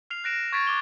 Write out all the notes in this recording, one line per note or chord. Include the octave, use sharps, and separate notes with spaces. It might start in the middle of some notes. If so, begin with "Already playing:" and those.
F6 C7 F7
F#6 A#6 D7 E7
C#6 G#6 A6 B6 D7
D6 G7